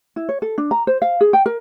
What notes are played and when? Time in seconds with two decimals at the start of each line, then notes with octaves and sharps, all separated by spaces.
0.16 E4
0.29 C#5
0.42 A4
0.58 D4
0.71 A#5
0.87 C5
1.02 F5
1.21 G#4
1.33 G5
1.46 A#4